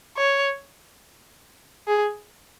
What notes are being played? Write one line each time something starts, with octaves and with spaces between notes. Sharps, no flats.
C#5
G#4